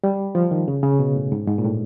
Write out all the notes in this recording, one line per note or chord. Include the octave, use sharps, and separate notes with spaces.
G3
F3
D#3
C#3
C#3
B2
A2
G#2
G#2
A#2
A2